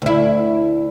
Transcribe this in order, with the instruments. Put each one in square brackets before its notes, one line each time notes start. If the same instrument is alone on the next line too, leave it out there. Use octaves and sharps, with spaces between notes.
[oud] D2 E4